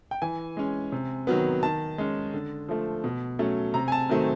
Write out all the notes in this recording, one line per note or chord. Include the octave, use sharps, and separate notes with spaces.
G5
E3 G#5
G#3 C#4
C3
D#3 F#3 B3
D#3 A5
G#3 C#4
D3
F3 A3
B2
F#3 A3 C#4
C3 A#5
G#5
A5
D#3 F#3 A3 C4